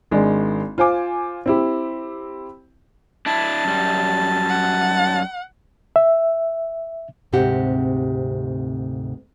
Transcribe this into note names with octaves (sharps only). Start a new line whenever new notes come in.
G#1 G#3 D4
F4 C5 G#5 D6
C4 E4 G4
D4 E4 A5
F#2 G3
F#5
E5
D2 G#2 C3 C4 G4 F#5